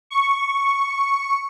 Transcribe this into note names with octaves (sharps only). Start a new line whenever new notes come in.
C#6